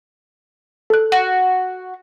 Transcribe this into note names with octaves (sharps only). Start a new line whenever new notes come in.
A4 F#6
F#4